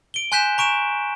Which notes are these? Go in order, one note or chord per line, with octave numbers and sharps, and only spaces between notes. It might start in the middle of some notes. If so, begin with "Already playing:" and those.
D7 G7
G#5 C6 F#6 G6 B6 E7
A#5 C#6 D7 E7